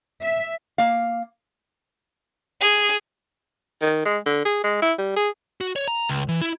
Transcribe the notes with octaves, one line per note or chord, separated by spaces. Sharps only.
E5
A#3 F5
G#4
D#3
G#3
D3
G#4
G#3
E4
G3
G#4
F#4
C#5
A#5
C#2
E3
E4